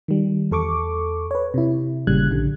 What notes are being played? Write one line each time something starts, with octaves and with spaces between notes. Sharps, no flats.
D#3 G3
E2 A4 C#6 D6
B4 C#5
C3 E4
G#1 A#2 C#3 G3 F#6 G#6
A#1 D3